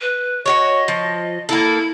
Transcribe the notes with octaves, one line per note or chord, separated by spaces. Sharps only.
B4
F#4 G4 C#5 D#5
F3
A#3 E4 A4